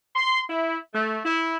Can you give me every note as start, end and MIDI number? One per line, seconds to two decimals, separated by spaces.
0.15 0.40 84
0.49 0.76 64
0.93 1.18 57
1.23 1.57 64